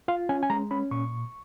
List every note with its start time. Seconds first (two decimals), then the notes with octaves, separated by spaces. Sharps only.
0.08 F4 F5
0.29 C#4 G#5
0.43 G#5
0.50 G#3 A#5
0.71 C#4 B5
0.91 A#2 C#6